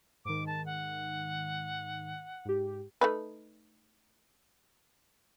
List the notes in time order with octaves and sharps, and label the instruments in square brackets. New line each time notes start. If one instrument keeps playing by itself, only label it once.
[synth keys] G#2 D#3 [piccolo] D6
[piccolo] A5
F#5
[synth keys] G#2 G4
[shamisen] A3 D#4 B4